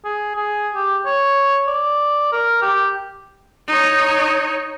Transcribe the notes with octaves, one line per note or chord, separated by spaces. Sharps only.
G#4
G#4
G4
C#5
D5
A#4
G4
D#4 C#5